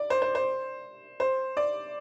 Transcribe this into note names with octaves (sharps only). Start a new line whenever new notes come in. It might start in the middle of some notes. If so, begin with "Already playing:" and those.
Already playing: D5
C5
C5
C5
C5
D5